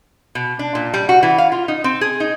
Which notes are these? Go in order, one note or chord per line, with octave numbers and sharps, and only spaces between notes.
B2
D4
A#2
G3
F#4
E3
F5
F4
D#4
C4
G#4
D#4